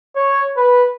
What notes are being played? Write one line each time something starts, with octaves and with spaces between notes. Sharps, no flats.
C#5
B4